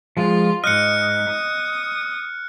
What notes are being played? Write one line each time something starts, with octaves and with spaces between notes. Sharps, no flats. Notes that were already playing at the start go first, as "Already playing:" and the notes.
F3 G#3 F4
G#2 D#5 F6 F#6 C#7
D#6